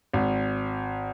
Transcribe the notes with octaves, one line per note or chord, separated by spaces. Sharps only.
G#1